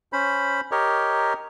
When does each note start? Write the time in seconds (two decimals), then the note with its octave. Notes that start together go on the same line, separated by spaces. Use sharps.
0.13 C#4 C5 B5
0.72 G4 A#4 C#5 D#5